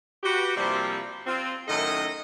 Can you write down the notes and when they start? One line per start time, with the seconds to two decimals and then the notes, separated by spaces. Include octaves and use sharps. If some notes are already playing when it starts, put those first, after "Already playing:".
0.23 F#4 G4 B4
0.55 C3 F3 G3 A#3 C4 E4
1.27 C4 F4
1.68 F#2 A2 D#3 A4 D#5 E5